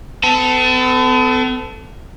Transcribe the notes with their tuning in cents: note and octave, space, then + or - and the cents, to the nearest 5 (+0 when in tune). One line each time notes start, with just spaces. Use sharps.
B3 +45 A4 +0